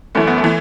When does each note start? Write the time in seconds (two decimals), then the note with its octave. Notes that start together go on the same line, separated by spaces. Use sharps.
0.15 F#2 E3 A3
0.27 B3
0.38 A3
0.44 E3